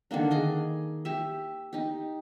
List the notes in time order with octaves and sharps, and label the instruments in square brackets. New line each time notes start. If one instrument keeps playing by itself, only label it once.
[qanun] D3 D#3 A#3 D4
G#4 D#5 G#5
G4 E5
D#4 G4